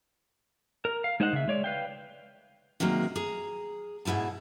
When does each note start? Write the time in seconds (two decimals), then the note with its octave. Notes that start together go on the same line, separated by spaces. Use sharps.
0.85 A#4
1.04 F5
1.20 G#3 D#4 C5 D#5 F#5
1.33 C#3 E5
1.48 G#3 C#5 D5
1.64 B4 F5 G5
2.80 C3 D#3 F#3 G#3 A#3
3.16 G#4 A#5
4.05 G#2 B2 E4 G#4 A5